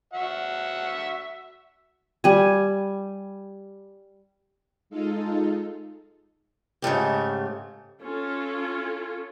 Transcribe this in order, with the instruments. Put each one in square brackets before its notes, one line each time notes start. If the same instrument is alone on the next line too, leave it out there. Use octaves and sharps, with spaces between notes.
[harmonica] F#4 E5 F#5
[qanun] G3 G#5
[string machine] G#3 D#4 F4 A4
[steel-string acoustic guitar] G#2 C#3 A3 G4
[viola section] C#4 F4 A4